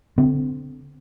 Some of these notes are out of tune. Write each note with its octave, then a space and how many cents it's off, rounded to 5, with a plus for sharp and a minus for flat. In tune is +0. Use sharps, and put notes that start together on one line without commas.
D3 -25 C4 -30